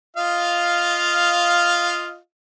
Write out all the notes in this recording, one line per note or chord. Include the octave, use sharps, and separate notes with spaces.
F4 D#5 F5